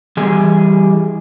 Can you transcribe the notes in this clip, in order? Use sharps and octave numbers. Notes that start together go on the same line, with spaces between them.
E3 G3 G#4 D#5